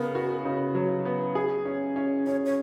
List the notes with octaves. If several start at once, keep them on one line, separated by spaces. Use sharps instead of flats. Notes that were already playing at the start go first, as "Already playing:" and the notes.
Already playing: C#3 B3 A#4
F#4
C#3
F#3
B3
G#4
C#4
C#4
C#4 C#5
C#5